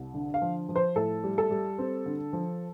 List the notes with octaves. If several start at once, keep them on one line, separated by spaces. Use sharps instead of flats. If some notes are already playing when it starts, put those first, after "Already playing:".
Already playing: C2
D3
F5
F3
F3
C5
A2 A4
G3
A4
G3
C4
D3
F3